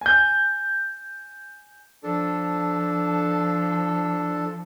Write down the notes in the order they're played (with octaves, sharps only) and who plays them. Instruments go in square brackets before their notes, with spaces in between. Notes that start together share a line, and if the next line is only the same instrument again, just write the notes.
[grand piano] G#5 G6
[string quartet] F3 [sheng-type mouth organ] D4 A4